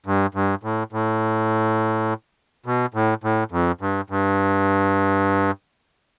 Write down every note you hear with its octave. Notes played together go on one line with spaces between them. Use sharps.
G2
G2
A2
A2
B2
A2
A2
F2
G2
G2